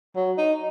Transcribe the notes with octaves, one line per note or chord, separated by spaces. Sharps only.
F#3
D#4